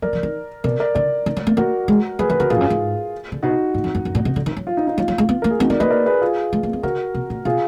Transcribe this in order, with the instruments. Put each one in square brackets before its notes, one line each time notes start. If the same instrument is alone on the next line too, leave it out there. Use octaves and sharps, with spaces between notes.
[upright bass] F#3 [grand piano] A#4 D5
[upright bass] F3
D#3
[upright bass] B2 [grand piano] A#4 D5
[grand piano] A#4 D5
[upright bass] D3 [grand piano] A#4 D5
[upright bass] D#3
F#3
A#3
[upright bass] A#3 [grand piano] F#4 A#4
[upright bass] G#3
[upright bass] F#3 [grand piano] G#4 B4
[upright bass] F3 [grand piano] G#4 B4
[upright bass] D3 [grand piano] F#4 A#4
[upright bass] A#2 [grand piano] F4 G#4
[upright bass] F2
F#2
G#2
D3
[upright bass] B2 [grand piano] D#4 F#4
[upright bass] G#2
F2
F#2
F#2
A#2
B2
D3
D#3
F#3
[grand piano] F4
D#4
D#4
[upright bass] F#3 [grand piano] F4
[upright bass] F#3
G#3
B3
[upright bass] A#3 [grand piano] A#4
[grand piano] G#4
[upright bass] B3 [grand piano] D#4 F#4
[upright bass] B3 [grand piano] A#4 D5
[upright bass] A#3 [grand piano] B4 D#5
[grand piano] A#4 D5
G#4 B4
F4 G#4
[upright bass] G#3
A#3
B3
[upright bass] D3 [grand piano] F#4 A#4
[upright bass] B2
A#2
[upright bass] B2 [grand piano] F4 G#4